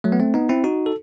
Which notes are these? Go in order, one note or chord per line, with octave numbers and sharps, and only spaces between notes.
F#3 A3
B3
A3 C4
B3 D#4
C4 E4
D#4 F#4
A4